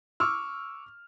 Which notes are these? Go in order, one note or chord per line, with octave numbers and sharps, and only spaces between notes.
C#6 D6 E6 F6